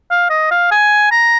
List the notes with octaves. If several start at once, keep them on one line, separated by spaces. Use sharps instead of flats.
F5
D#5
F5
G#5
A#5